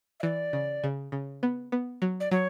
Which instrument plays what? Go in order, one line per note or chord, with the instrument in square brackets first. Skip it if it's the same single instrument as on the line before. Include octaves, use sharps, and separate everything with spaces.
[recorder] E5
[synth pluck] E3 [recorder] D5
[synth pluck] C#3
C#3
C#3
B3
B3
F#3
[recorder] D5
[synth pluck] F#3 [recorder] C#5